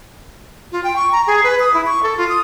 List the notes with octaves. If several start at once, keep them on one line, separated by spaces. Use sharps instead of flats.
F4
G5
C#6
A#5
G#4
B4
D#6
E4
C#6
A4
F4
D#6